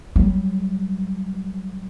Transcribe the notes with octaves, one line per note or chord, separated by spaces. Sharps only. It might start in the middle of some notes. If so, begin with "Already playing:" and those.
F#3 G3